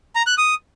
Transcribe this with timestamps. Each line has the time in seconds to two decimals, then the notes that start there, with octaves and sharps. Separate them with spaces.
0.16 A#5
0.27 F#6
0.38 D#6